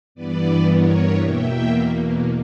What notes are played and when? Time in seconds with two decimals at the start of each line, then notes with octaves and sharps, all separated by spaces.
0.15 G2 E3 B3 B4 D5
0.68 A#4 C#5
1.22 E2 B2 A#3 E5 G5